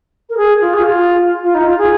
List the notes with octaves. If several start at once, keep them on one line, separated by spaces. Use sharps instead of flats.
A#4
G#4
F4
G#4
F4
F4
F4
D#4
F4
G#4